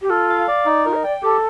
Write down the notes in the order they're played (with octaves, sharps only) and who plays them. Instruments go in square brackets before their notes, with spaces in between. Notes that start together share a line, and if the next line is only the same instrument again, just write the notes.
[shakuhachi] G4
[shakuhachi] F4 [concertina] A4
[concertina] F5
D5
D#4
[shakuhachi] F4 [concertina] A#4
[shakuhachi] D#5
[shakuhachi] D5 [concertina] G5
[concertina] G4 [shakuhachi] A4